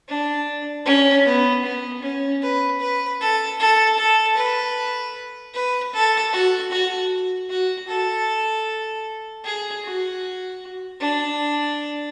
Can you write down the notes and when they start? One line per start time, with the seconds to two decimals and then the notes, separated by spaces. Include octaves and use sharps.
0.08 D4
0.86 C#4
1.26 B3
1.64 B3
2.03 C#4
2.42 B4
2.81 B4
3.21 A4
3.60 A4
3.99 A4
4.37 B4
5.54 B4
5.93 A4
6.33 F#4
6.72 F#4
7.50 F#4
7.88 A4
9.45 G#4
9.84 F#4
11.01 D4